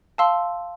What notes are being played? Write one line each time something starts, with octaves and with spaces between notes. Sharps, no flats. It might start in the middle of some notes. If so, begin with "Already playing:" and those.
F5 A5 C6 E6